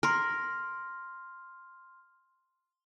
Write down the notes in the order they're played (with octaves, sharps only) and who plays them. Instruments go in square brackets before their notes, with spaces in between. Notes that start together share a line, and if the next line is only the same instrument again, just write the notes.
[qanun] A#4 [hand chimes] C6 F6